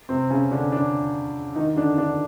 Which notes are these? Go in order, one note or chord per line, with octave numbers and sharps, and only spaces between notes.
C3 C4
C#3 C#4
D3 D4
D3 D4
D#3 D#4
D3 D4
D3 D4